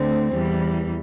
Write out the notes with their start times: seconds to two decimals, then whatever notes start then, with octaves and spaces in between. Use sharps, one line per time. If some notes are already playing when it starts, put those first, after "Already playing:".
Already playing: D2 D3 A3 C4
0.33 E2 E3 G3